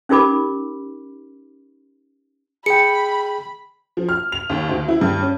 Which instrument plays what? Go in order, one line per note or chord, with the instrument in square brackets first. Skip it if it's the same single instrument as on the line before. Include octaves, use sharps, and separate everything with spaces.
[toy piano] C#4 D#4 G4 A#4 B5 D6
[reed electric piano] G#4 G5 [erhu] B5 [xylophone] C#7
[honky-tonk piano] F3
F6
F7
D#2
D2
E4
G2
C#4